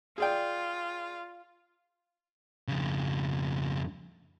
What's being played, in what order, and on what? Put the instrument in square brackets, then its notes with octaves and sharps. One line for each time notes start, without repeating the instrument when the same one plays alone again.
[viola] F4 [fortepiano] G#4 D5 G5
[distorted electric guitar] F2 C#3